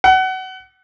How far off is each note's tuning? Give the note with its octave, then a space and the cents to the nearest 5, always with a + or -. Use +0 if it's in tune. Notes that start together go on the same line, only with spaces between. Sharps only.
F#5 +25